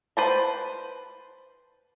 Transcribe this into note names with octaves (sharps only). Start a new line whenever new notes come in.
B4 C5 A5